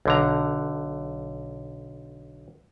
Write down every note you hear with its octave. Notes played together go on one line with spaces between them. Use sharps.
B1 D3 A#5